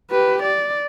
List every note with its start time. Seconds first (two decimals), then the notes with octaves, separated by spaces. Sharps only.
0.11 G4 B4
0.43 D5